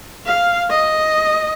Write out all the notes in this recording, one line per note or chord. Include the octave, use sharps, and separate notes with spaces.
F5
D#5